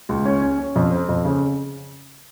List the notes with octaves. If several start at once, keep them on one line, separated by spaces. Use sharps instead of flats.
C#2
C#4
C#4
C#4
F2
C4
F2
C#3